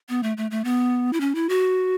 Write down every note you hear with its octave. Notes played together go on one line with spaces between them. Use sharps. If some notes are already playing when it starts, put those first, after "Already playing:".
B3
A3
A3
A3
B3
E4
C#4
E4
F#4